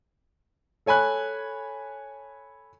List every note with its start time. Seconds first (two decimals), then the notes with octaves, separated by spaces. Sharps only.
0.86 A4 C#5 G#5 B5 F#6